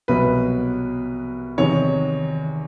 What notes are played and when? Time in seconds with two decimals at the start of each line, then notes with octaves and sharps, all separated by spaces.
0.08 C2 B2 F#3 B4
1.58 E2 C3 D#3 C#5